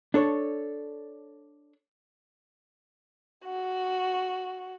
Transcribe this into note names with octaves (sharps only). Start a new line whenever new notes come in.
D4 A4 C#5
F#4